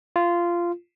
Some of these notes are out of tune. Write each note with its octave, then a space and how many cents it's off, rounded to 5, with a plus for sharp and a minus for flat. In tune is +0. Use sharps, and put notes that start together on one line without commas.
F4 -15